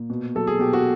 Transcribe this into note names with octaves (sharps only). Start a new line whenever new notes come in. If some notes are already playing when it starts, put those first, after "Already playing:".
Already playing: A#2
B2
F#3 A4
G#4
B2 G4
F#4